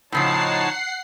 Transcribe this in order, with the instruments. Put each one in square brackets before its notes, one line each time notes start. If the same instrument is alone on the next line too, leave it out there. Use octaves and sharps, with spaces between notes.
[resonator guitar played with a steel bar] A2 C#3 F3 [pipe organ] D#4 C#5 A5 [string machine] F#5 C7